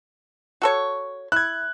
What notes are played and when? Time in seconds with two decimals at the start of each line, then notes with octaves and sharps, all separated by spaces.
0.62 F#4 A4 C#5
1.32 E4 F#6 G#6